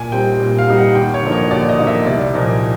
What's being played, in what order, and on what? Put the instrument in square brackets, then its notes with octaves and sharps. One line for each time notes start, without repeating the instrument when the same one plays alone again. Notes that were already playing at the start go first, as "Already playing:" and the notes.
Already playing: [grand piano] A#2 G#5
G3 C4 D#4 G5
A#2
F5
G3 C4 D#4
F#5
D#2 G5
C#5
D3 F3 A#3 D#4
C#5
D#2 D5
D#5
D3 F3 A#3 D#4
E5
C2 D5
A#2 F3 A#3 D#4